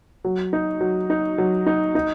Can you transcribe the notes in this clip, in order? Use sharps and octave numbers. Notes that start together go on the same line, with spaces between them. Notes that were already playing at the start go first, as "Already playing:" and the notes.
F#3
D#4
F#3
D#4
F#3
D#4
D#4